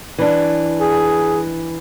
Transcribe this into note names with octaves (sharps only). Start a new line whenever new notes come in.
E3 D4
G#4